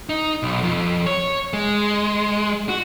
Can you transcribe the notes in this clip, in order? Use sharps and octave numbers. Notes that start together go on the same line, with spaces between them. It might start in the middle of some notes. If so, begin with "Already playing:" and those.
D#4
B1
F2
C#5
G#3
F#4